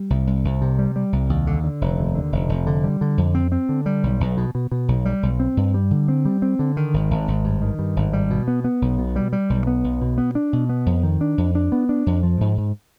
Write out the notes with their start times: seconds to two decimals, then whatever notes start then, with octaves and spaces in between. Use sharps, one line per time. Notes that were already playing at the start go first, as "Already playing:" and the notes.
Already playing: G3
0.10 C2
0.27 C2
0.45 C2
0.61 C3
0.78 G3
0.96 G3
1.13 C2
1.30 D#2
1.47 D3
1.64 D3
1.81 F1
1.98 D#2
2.15 D3
2.32 F1
2.49 F1
2.67 D3
2.84 G3
3.01 D3
3.18 F2
3.35 C4
3.52 C4
3.69 D3
3.86 G3
4.03 B1
4.20 B1
4.37 B2
4.55 B2
4.71 B2
4.88 B1
5.05 G3
5.23 B1
5.40 C4
5.57 G2
5.74 G3
5.91 D3
6.08 C4
6.25 G3
6.42 C4
6.59 D3
6.77 D#3
6.94 G#1
7.11 G#1
7.28 G#1
7.45 G2
7.62 D#3
7.79 G2
7.96 G#1
8.13 G3
8.30 B2
8.48 B3
8.64 B3
8.82 B1
8.98 B2
9.16 G3
9.33 G3
9.50 B1
9.67 B3
9.84 B1
10.01 B2
10.18 B3
10.35 D4
10.53 B2
10.69 B3
10.86 F2
11.03 D#3
11.21 D4
11.38 F2
11.55 D4
11.72 B3
11.89 D4
12.06 F2
12.23 F3
12.41 G#2
12.57 G#2